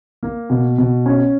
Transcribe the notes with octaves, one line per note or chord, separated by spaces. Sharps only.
A#3
B2
B2
C#4